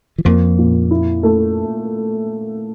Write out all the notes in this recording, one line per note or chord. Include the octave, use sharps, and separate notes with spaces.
E3
F2 F3 A#3
A#2
E4
A3